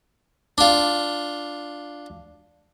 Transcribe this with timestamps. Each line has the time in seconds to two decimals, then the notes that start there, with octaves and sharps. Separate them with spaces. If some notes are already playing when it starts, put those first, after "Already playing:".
0.58 D4 F4